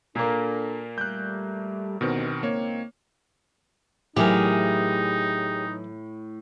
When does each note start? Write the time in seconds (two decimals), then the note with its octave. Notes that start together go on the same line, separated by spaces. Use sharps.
0.15 A#2 A#3 D4 A4
0.98 G3 A3 F#6 G6
2.01 G1 D2 B2 D#3 B3 C4
2.43 C#2 A#3 C4 D#4 C#5
4.17 A2 E3 F#3 D#4 G4 G#4 A#4